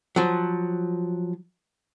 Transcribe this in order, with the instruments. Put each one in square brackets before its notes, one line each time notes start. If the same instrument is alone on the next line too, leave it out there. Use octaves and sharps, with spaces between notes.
[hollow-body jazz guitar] F3 F#3